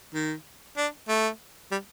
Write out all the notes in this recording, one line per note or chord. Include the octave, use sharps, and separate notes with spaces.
D#3
D4
A3
G3